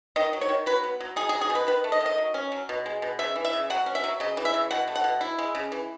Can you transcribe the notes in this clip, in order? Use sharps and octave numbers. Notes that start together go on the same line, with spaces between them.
D#3 D#5
F#3
C#5
D#3
F#3 B4
B3
F#3
D#4 G#4
G#4
F#3
G#4
B2
B4
D#3 B4
A3
D#5
D#3
D#5
F#3
C#4
F#3
B2
G#3
B2
C#3 E5
E3
E5
C#3
F#3 F#5
C#4
E5
F#3
C#3 D#5
E3
E5
C#3
B2 F#5
A3
F#5
B2
E4
G#3
C#3
E3